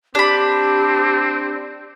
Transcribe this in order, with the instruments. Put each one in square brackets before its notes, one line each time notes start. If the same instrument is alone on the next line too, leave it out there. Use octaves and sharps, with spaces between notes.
[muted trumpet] C4 [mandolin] D4 B5 [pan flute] G4